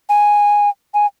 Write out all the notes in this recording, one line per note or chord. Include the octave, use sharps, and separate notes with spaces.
G#5
G#5